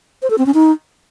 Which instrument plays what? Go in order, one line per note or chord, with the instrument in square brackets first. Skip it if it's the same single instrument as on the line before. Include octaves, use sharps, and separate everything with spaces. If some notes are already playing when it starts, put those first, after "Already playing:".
[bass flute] C5
A4
C4
C#4
D#4